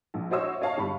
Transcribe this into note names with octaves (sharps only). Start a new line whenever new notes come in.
A#1
F#4 C5 C#5 D#5 E5 E6
C#5 D#5 F5 A5
G1 G3 B5 C#6